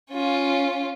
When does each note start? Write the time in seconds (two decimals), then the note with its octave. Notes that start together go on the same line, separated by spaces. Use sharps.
0.11 C#4 F4